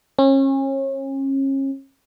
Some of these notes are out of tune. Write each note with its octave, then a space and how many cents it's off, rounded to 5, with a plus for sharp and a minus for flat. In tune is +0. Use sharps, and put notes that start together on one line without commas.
C#4 -35